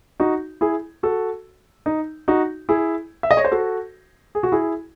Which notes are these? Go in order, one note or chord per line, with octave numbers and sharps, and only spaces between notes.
D#4 F#4
E4 G#4
F#4 A4
D#4
D#4 F#4
E4 G#4
E5
D#5
C#5
C5
F#4 A4
G#4
F#4
E4 G#4